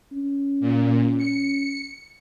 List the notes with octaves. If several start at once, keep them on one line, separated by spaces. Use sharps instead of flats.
C#4
A#2
C#7